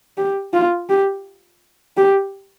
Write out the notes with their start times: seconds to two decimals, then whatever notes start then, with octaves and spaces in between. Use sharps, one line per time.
0.18 G4
0.53 F4
0.90 G4
1.97 G4